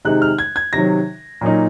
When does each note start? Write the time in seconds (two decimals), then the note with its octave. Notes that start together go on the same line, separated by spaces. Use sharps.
0.05 C3 D#3 G#3 D#4 F#6
0.22 F6
0.39 G#6
0.56 G#6
0.73 C3 D#3 F#3 A#6
1.41 A#2 F#3 A#3 D#4